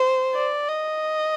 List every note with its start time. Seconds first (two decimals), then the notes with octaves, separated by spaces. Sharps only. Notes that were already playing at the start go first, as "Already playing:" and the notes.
Already playing: C5
0.35 D5
0.68 D#5